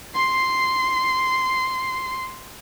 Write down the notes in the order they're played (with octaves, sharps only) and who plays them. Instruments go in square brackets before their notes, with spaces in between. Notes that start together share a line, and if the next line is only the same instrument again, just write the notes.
[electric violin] C6 C7